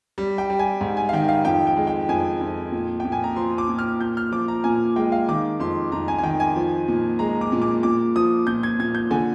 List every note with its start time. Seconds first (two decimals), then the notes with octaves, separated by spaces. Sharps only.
0.18 G3
0.38 G5
0.50 G3
0.59 G#5
0.81 G#2
0.97 G#5
1.09 F5
1.13 D#3 G5
1.29 F5
1.45 F2 G5
1.67 G5
1.76 G#3
1.87 G5
2.09 F2 G#5
2.41 F2
2.72 A#2
3.00 A#2 G5
3.12 G#5
3.24 A#5
3.36 F3 C6
3.58 D6
3.68 A#2
3.79 F6
4.00 A#2 G6
4.17 F6
4.32 F3 D6
4.48 A#5
4.64 A#2 G#5
4.96 G#3 G5
5.12 F5
5.29 D#3 D6
5.60 F2 C6
5.92 F2 A#5
6.08 G#5
6.18 G#5
6.23 D#3 G5
6.40 G#5
6.56 F3
6.88 A#2
7.19 G#3 A#5
7.41 D6
7.52 A#2
7.62 D6
7.83 A#2 D6
8.16 F3 D#6
8.47 A#2 G6
8.63 G#6
8.79 A#2 G#6
8.95 G6
9.11 D3 G#5